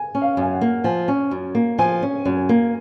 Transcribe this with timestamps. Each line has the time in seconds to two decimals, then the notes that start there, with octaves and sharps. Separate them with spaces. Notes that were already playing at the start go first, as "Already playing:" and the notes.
Already playing: G#5
0.15 C#4
0.22 F5
0.37 F#2 G#5
0.54 F#5
0.61 A#3
0.84 F3 G#5
1.08 C#4
1.31 F#2
1.55 A#3
1.79 F3 G#5
2.02 C#4
2.26 F#2
2.49 A#3